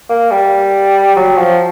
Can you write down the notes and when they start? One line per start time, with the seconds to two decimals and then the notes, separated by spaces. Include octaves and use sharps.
0.09 A#3
0.31 G3
1.16 F#3
1.38 F3